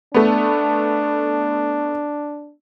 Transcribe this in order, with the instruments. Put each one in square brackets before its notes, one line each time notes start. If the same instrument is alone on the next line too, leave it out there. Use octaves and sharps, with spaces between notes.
[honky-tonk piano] A3 B3 [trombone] D4